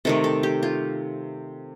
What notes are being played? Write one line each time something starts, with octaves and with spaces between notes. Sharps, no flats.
C3 D#3 A3 A4
A4
G4
F4